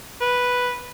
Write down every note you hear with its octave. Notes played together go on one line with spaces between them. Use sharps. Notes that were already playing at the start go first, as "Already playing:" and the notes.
B4